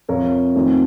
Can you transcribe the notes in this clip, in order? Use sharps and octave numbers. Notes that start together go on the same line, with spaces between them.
F2 C3 F3 A#4 C#5
F2 D#3 A3 C4